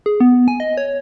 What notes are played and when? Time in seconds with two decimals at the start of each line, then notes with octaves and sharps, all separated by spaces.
0.06 G#4
0.20 B3
0.48 G#5
0.60 D#5
0.77 C#5